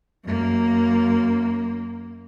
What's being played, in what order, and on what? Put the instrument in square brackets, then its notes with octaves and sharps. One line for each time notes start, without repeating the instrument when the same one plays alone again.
[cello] F#2 A#3